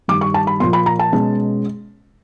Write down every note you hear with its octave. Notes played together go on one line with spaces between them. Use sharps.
G2 D#3 G3 D6
C#6
A5
B5
A#2 F3 A#3 C6
B5
A#5
A5
B2 G#3 C#4